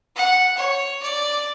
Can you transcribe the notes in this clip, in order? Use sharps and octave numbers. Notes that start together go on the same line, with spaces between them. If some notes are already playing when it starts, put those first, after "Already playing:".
F#5
C#5
D5